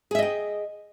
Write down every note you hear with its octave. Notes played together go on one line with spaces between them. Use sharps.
G#4 D#5 E5 G5